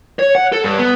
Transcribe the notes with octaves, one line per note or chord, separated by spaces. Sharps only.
C#5
F#5
A4
G2
B3